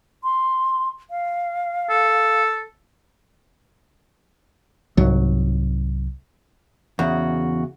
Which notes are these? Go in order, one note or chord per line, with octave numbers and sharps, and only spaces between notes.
C6
F5
A4
C2 G#2 F#3
E2 C#3 F#4